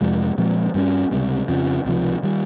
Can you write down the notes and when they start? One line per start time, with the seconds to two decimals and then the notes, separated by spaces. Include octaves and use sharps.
0.01 F2 C3 F3 G#3
0.38 A#2 F3 G#3 C4
0.74 G2 G3 A#3 C#4
1.11 C#2 C3 G3
1.48 F2 C#3 F3
1.85 C#2 C3 F3
2.23 D#3 G3